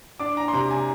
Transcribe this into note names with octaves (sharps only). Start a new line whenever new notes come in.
D4 D6
A#5
C6
C3 A#5
G#5